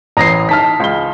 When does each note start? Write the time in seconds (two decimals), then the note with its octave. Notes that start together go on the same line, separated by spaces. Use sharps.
0.17 A1 A#5 D#6 A#6 C7
0.49 D#4 A5 F6 B6
0.80 C#2 G7